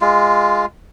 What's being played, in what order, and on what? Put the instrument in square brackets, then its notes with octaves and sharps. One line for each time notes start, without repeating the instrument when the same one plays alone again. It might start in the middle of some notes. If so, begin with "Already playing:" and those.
[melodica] G#3 F4